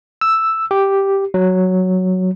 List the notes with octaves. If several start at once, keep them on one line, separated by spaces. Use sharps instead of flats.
E6
G4
F#3